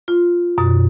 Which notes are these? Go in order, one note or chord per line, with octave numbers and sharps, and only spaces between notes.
F4
F#2 B2